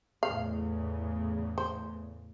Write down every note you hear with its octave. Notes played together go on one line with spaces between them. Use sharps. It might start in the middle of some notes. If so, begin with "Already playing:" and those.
E2 A2 C#3 F5
C5